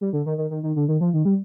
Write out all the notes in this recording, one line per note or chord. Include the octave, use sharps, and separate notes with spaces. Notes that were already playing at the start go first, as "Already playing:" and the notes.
G3
D3
D#3
D#3
D#3
D#3
D3
D#3
F3
D#3
G3